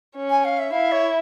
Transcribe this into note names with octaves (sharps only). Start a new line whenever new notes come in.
C#4
G#5
F5
E5
E4 F5
C#5